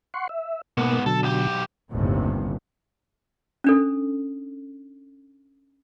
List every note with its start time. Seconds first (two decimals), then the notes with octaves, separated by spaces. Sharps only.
0.14 F#5 C6 C#6
0.29 E5
0.77 G#2 B2 A#3 B3
1.06 B2 D3 F#3 A4
1.23 B1 G4
1.91 G1 D#2 A2 C3
3.64 C#4 D4 A4